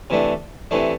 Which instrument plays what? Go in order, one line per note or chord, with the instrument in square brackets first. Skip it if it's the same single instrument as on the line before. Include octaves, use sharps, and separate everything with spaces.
[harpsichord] C3 E3 A3 D4
C3 E3 A3 D4